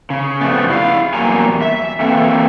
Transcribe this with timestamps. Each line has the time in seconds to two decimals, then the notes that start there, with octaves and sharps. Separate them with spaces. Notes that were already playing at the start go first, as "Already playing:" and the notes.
0.10 C#3
0.41 F2 G3 A3 B3
0.70 E4 F5
1.14 E2 F#3 G3 A#3 G#5 A#5
1.62 E5
2.00 E3 A#3 C4 A4